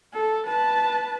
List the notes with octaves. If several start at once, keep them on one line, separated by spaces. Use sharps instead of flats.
A4
B4 A5